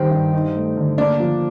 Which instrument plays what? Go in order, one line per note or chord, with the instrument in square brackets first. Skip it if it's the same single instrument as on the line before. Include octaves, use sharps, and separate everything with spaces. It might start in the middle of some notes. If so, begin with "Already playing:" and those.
Already playing: [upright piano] D#3 G3 [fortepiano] C4
[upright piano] G2
D#4
A3
D3
[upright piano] A#3 [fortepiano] D4
[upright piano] F3